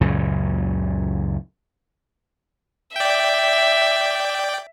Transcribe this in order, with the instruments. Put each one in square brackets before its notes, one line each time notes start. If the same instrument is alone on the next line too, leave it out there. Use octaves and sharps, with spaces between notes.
[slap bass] C#2 F#2 A#2 C#3
[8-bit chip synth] D5 G5 [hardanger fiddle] E5